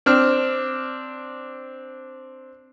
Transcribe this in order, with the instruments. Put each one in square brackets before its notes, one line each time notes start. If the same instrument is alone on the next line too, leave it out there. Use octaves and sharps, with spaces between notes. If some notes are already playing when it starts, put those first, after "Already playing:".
[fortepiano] C4 D4 F6